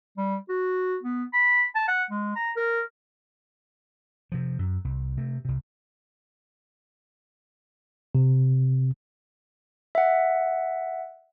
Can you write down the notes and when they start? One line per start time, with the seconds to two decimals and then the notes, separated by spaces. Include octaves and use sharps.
0.17 G3
0.49 F#4
1.03 B3
1.33 B5
1.75 A5
1.88 F#5
2.11 G#3
2.36 A#5
2.56 A#4
4.32 C3 F3
4.59 F#2
4.84 C2
5.17 C3 A3
5.45 C2 C3
8.15 C3
9.95 E5 F#5